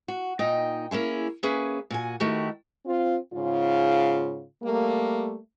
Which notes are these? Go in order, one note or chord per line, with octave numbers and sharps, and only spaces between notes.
F#4
A#2 D#4 D#5 G5
A#3 C#4 E4 G#4
A#3 C#4 G#4 B4 E5 G#5
A#2 F#4 G#5
D#3 A3 E4 F#4 G4
C4 F4
G#2 C#3 F4
G3 A3 A#3